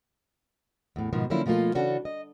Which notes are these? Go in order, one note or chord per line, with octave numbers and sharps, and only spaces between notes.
E2 A2
G#2 B2 D#3 F3
D3 F3 F#3 A#3 C#4 E4
B2 F3 A3 A#3 F4
C#3 E3 C#4 D4 F#4 A4
D#5